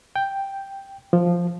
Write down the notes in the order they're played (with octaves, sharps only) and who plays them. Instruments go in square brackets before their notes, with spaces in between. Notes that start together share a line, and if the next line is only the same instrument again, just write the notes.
[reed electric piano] G5
F3